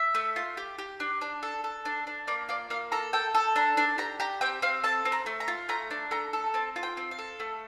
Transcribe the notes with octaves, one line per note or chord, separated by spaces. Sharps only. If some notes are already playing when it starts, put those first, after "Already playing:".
Already playing: E5
A3
F4
G4
G4
D4
D4
A4
A4
D4
D4
A#3 D5
F4 D5
A#3 F5
A4 A#5
A4 G5
A4
D4 A#5
D4
G4 A#5
G4 A#5
C4 G5
C4 F5
A4 A5
C4
A#5
A3
A#5
F4
A3 A#5
D4
A3 A#5
A4
C4 A5
F4
G5
C4
F5
A4
A3